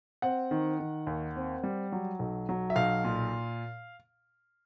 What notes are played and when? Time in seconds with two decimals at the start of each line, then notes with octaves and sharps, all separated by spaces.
0.22 C4 F#5
0.51 D#3
0.79 D#3
1.07 D#2
1.36 C4
1.63 G3
1.92 F#3
2.19 B1
2.49 F#3
2.70 E5
2.76 B1 F5
3.04 A#2